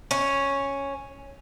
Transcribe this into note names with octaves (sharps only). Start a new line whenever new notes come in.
C#4